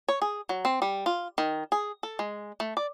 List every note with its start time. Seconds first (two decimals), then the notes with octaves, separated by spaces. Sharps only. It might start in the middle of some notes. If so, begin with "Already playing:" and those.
0.09 C#5
0.22 G#4
0.49 F#3
0.65 C4
0.82 G3
1.06 F4
1.38 D#3
1.72 G#4
2.03 A4
2.19 G#3
2.60 A3
2.77 D5